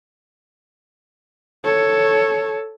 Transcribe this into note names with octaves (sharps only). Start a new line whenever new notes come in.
A4 C#5